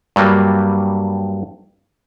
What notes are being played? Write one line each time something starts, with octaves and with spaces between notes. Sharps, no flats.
G2 F#3 G3 A#3